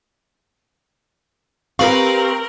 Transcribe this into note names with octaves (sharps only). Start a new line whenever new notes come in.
C4 G4 A#4 B4 F5 C#6 F#7